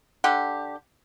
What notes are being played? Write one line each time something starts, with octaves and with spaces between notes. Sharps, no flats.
D3 G4